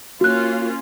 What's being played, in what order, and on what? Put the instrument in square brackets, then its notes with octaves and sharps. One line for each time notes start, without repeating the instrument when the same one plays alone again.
[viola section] A#3 C#4 F4 [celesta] F#4 F#6